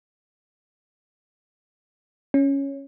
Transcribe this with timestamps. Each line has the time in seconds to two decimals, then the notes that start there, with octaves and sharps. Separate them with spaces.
2.34 C#4